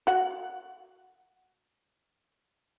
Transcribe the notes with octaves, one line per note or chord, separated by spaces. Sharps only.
F#4 F#5